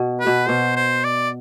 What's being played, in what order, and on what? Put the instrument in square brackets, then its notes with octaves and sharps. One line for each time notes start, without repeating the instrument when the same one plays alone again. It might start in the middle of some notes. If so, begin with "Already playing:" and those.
Already playing: [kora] B2
[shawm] B4
[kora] B2
[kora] B2 [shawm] C5
[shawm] C5
D5